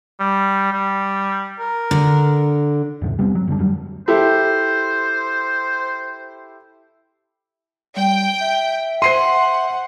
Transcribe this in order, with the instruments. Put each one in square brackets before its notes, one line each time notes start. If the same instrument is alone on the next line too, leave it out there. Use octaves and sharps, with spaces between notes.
[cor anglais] G3
G3
A#4
[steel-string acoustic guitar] D3
[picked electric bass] E2 G#2 C3
G3 B3 C4
F#3
F#1 D3 G3 D4
F2 F#3 G3
[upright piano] E4 G4 A4 [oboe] C5
[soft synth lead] G3 [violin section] G5
[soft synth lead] E5
[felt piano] C5 C7 D#7 [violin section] F#5 [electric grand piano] C6